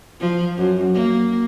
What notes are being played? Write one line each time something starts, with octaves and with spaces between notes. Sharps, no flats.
F3
F#2
A#3